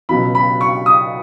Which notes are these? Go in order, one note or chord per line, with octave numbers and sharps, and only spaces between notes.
C#2 B2 F#3 B5
B5
C#6
D#6